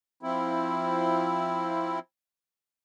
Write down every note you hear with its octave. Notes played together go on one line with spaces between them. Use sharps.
F3 C4 E4